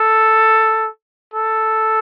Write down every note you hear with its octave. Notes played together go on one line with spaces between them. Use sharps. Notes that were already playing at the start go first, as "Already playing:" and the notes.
Already playing: A4
A4